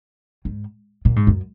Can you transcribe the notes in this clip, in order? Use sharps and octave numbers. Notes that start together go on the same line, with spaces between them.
G#2
A#2
G#2
F#2